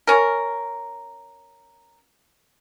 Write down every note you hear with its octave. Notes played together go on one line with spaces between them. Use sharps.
C#4 A#4